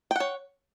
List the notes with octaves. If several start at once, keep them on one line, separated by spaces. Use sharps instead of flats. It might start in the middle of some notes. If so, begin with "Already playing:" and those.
C#5 F#5 G5